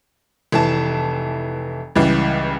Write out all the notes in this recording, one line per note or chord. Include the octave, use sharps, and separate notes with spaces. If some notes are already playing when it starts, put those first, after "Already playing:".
F1 E3 A5
C#2 E3 G3